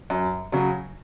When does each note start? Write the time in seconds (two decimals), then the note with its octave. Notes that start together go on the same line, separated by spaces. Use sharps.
0.10 F#2
0.52 C#3 F#3